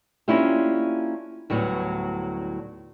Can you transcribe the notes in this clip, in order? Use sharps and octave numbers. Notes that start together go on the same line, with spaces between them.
A#3 C#4 D4 E4 F4 G4
D2 A2 F#3 G3 B3